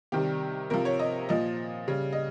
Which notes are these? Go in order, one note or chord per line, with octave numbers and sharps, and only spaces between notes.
C3 D#3 G3 G4
C3 F3 A#4
C#5
D#5
A#2 F3 D#5
C#3 G3
D#5